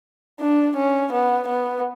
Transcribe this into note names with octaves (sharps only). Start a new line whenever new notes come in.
D4
C#4
B3
B3